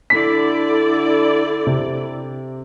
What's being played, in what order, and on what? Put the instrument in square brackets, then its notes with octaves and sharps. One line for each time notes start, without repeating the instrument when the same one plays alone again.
[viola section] D3 E4 D5 [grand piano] B6
[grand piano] C3